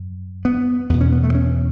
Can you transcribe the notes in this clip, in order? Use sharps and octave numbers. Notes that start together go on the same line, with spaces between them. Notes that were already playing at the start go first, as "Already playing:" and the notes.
Already playing: F#2
B3
E2 B2 B3
C#4
B3
A3
C#4